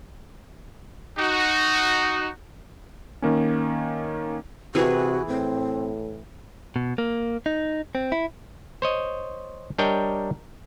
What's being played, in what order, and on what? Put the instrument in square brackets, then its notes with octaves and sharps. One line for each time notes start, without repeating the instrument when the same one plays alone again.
[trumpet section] D#4 F#4
[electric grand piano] D#3 A#3 C#4
[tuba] C3 [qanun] E3 G#4 B4 [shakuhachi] F#4
[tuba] A2 [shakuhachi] C4
[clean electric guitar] B2
A#3
D#4
C4
E4
[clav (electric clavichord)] C5 C#5 D#5
G3 D4 A#4 C#5 D#5 G5